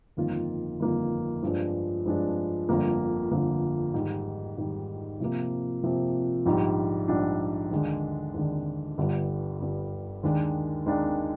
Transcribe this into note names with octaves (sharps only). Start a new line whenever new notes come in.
G1 F2 D#3 A#3 F4
G1 F2 D#3 A#3 F4
G2 F3 G#3 D4
G2 F3 G#3 D4
G1 F2 D3 F3 A#3
G1 F2 D3 F3 A#3
G#2 D#3 G3
G#2 D#3 G3
C3 F3 A#3
C3 F3 A#3
A#1 G#2 G3 D4
A#1 G#2 G3 D4
D#2 D3 G#3 D4
D#2 D3 G#3 D4
G1 G2 D3 G3
G1 G2 D3 G3
D#2 D#3 G#3 D4
D#2 D#3 G#3 D4